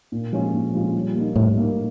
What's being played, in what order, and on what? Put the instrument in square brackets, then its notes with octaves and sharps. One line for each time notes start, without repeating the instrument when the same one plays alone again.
[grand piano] A#2
F3 G#3 C#4 F4
A#2
F3 G#3 C#4 F4
G3
A#3 D#4
[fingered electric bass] A2 [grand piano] G3
[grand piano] A#3 D#4